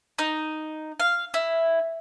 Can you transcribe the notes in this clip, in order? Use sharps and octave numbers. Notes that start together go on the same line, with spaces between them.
D#4
F5
E4